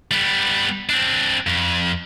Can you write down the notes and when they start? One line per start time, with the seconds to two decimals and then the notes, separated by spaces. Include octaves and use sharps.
0.11 G3 B3
0.89 C4 D4
1.47 F2